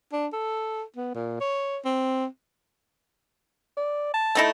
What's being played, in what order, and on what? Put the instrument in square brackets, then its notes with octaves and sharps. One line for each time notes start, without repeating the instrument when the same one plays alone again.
[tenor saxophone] D4
A4
B3
A#2
C#5
C4
[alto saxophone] D5
A5
[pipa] A3 D#4 E4